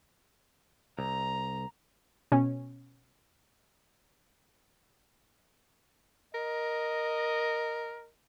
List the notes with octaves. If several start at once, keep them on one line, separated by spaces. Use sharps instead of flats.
C2 A#5
B2 C#4
A#4 D#5